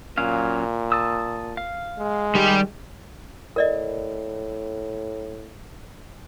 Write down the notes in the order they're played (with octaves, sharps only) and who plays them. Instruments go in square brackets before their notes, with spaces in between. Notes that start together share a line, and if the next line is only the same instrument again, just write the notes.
[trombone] A#2 [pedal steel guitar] F#3 C#4 F5
[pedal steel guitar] A5 D#6 E6
F5
[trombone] G#3
[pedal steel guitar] D#3 [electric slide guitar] G3 G4
[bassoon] A2 [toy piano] A#4 D5 D#5